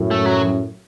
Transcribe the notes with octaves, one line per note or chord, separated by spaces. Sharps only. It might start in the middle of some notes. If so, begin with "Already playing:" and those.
Already playing: F#2 A2
A3
F#3